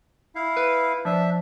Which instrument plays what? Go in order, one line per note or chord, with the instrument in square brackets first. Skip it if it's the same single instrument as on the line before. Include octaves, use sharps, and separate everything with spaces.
[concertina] E4 F5
[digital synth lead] B4
[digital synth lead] F3 [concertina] D4 E5